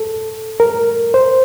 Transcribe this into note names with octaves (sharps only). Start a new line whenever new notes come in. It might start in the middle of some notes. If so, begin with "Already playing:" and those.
Already playing: A4
A#4
C5